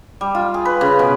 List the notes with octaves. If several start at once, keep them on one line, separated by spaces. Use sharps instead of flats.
G3
F4
G#4
B4
C#3
B2